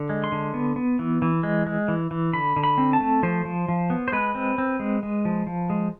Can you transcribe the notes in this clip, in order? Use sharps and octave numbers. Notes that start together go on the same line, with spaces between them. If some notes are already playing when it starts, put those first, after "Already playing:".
Already playing: D3
G#3
C6
D3
B3
B3
E3
E3
G#3
G#3
E3
E3
D3 B5
D3
B5
C4
A5
A3
F3 C5
F3
F3
B3
C5
G#3 B4
C4
C4
G#3
G#3
F3
F3
G#3